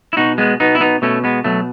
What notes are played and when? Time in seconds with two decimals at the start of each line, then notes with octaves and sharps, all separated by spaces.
0.13 E4
0.17 B2 D#4 F#4
0.38 G#3 B3
0.60 B2 B3 D#4
0.75 E4
0.81 B3 D#4
1.02 B2 A3 C#4
1.24 G#3 B3
1.44 B2 F#3 A3